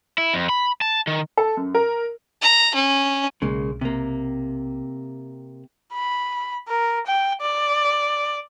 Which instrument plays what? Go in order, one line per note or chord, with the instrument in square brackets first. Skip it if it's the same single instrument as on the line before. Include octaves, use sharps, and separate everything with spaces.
[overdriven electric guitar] E4
F2
B5
A5
D#3
[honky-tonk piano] A4
F#2
A#4
[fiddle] A#5
C#4
[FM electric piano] B1 [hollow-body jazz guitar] C#3 G#3 A#3
[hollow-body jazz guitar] C3 A#3
[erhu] B5
A#4
G5
D5